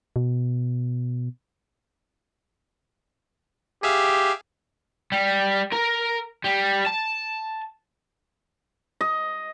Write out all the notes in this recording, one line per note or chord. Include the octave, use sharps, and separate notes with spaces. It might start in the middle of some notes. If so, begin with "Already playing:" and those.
B2
G4 G#4 E5 F5
G3
A#4
G3
A5
D#5